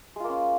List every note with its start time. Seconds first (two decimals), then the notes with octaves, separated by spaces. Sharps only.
0.16 G#3
0.20 F4
0.24 A#3
0.28 C#4